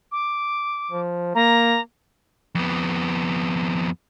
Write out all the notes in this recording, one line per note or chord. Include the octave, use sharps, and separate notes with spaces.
D6
F3
A#3 A#5
F2 B3